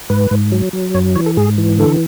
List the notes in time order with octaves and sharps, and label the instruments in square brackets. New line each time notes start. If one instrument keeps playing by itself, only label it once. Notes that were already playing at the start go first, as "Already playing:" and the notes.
[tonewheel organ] G#2 B4
G#2
F#3
F#3
F#2 C#5
E3 C#5
A4
G#2 G#4
E3
D3 A4